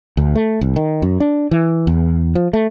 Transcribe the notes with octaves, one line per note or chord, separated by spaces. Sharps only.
D2
A3
C2
D#3
F#2
D4
E3
E2
F3
A3